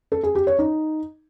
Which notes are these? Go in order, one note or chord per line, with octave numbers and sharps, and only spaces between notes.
A4
G#4
G4
C#5
D#4